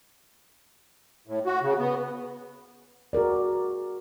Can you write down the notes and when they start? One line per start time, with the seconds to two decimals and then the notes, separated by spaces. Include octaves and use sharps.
1.27 A2
1.46 F#4
1.63 C#3
1.79 B3
3.13 F#4 G#4 A#4 D5